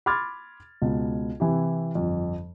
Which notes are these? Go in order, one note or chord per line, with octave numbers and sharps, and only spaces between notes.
B5 C6 D6 F6 G#6 A6
C#2 B2
C3 E3 E4 G4
G1 F2